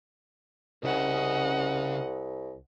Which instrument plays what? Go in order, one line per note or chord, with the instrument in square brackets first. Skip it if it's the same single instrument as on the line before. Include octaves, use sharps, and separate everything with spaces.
[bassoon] C2 [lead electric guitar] C#3 G#4 [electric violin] D#5 F#5